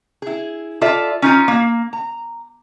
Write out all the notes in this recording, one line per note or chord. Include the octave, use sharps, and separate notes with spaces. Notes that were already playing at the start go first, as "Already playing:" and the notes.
E4 G#4
F4 A4 D5 E5
C#4 D#4 F4
A#3
A#5